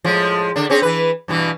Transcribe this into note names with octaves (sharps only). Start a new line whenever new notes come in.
A2 F3 G#3
D3 D4
C4 C#4 G#4
E3 B4
G2 B2 E3